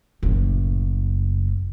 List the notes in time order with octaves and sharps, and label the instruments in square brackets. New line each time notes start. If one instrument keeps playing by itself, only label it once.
[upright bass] F#1 A2